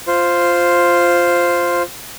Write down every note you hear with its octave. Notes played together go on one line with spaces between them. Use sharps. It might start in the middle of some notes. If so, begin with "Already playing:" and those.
F4 C5